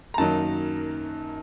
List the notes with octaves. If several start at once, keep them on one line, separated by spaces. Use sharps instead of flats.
A#5
F#2 D#3 F#3 A#3 D#4 A5